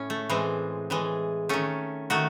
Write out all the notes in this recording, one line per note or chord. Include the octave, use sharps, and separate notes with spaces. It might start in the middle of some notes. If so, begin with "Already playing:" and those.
Already playing: A2 C#4
A3
A2 E3 G#3 C4
A2 E3 G#3
D#3 A3 C#4
D#3 A3 F#4